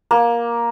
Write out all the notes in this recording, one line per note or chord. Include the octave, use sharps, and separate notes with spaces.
A#3